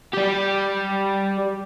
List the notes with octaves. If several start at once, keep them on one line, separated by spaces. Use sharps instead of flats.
G3 G4